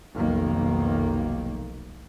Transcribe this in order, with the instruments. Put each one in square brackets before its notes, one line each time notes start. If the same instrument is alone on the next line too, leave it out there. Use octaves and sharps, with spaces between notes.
[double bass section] F1 B1 D#3 A#3